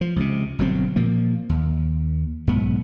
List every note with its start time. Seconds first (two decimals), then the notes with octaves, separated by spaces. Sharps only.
0.01 F3
0.16 C#2 C3
0.59 G1 B2 F#3 C4
0.96 A#2 F3 A#3
1.49 D#2
2.47 B1 G#2 B3